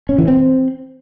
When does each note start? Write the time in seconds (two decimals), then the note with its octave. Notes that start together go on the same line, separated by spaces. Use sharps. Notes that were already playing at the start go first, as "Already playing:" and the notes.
0.09 C#4
0.18 E3
0.28 C4